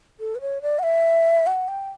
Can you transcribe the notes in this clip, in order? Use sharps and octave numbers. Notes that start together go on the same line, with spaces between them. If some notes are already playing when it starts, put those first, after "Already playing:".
A4
B4
C#5
D5
F#5
E5
F#5
G5